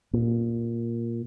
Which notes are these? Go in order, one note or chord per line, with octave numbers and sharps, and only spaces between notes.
A#2